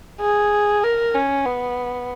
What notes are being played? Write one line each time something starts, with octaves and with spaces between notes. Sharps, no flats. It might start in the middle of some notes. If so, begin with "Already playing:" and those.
G#4
A#4
C#4
B3